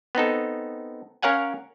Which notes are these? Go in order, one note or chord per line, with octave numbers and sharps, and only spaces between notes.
B3 C4 D#4 A4
C#4 A#4 C#5 F5 F#5 G#5